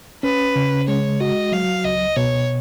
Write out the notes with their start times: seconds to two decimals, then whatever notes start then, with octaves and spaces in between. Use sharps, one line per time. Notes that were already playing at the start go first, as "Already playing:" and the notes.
0.23 C#4 B4
0.56 C#3
0.88 G#3 C#5
1.20 F#4 D#5
1.52 F#3 F5
1.85 C#2 D#5
2.17 B2 C#5